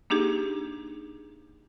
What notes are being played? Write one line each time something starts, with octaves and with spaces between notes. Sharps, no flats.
A#3 D4 D#4 G4 G#4